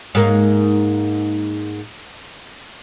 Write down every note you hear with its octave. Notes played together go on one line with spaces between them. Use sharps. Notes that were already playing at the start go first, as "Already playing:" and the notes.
G#2 A#3